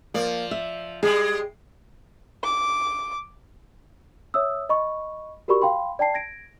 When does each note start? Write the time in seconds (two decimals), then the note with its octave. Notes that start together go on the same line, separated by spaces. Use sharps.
0.14 F3 A#3 D5
0.51 E5
1.03 G3 G#3 G#4
2.44 D6
4.34 C#5 E5 D#6 E6
4.69 D#5 B5 C#6
5.48 F#4 G4 A#4 D5 B5 C#6
5.62 F5 G5 B5 C6
5.99 D5 G5 A5 C7
6.14 G#6 A#6 D7